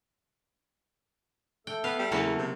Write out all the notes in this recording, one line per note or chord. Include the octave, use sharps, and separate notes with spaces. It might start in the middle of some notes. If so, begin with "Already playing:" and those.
A3 A4 G5
B3 F5
G3
E2 C#3 F#3 A#3
C3